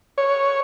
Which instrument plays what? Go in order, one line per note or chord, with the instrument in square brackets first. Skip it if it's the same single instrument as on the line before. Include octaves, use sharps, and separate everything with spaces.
[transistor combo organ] C#5